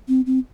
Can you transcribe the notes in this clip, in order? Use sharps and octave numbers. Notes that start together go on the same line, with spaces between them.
C4
C4